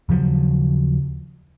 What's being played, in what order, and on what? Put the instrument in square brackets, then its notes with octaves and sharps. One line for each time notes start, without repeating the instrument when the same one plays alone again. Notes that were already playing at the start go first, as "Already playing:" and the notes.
[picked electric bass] D#2 C#3 F3 F#3